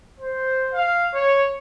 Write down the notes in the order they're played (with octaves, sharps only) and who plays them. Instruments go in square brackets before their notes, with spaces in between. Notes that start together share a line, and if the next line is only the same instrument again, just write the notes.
[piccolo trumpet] C5
F5
C#5